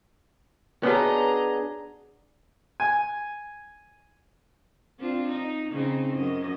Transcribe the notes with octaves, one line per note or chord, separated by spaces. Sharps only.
B3 D4 F#4 G#4 B4 C#5 D#5 A#5
G#5
C4 D4 F4
D#4
C#3 C4 D#4
F#2 D#5